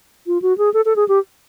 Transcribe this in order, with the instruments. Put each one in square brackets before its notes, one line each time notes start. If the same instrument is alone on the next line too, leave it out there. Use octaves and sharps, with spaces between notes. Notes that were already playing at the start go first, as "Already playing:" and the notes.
[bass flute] F4
F#4
G#4
A4
A4
G#4
G4